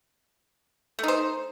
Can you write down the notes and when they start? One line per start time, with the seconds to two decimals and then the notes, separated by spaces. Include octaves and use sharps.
0.99 A3
1.03 D#4
1.08 C5